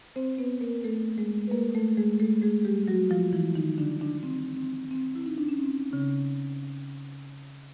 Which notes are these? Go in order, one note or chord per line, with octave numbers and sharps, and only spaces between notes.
C4 C5
B3 B4
A#3 A#4
A3 A4
G#3 G#4
B4
A#3 A#4
A3 A4
G#3 G#4
A3 A4
G#3 G#4
G3 G4
F#3 F#4
F3 F4
E3 E4
D#3 D#4
D3 D4
D3 D4
C4
C4
C4
E4
D#4
D4
C#4
C4
C#3 C#4